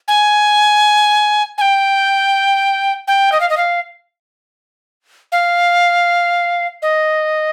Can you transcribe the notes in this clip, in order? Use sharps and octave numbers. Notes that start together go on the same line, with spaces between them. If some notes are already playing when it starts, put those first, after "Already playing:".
G#5
G#5
G5
G5
D#5
F5
D#5
F5
F5
D#5